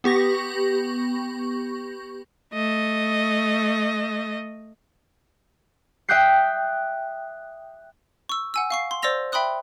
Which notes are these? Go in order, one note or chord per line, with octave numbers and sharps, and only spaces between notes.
B3 G4 C#6 A#6
A3 D#5
E5 G5 D#6 F#6 G6 C7
C#6 E6
F#5 G#5 E6
F5 C#6 C7
C6
C5 D5 C6 E6 A#6 F7
E5 G5 B5 C6 D#6 F#6